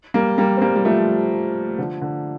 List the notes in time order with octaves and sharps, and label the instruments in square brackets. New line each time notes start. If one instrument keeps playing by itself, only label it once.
[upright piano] G3 A#3
G3 A#3
C4
G3 A#3
G3
F3 A3
D3 F3
D3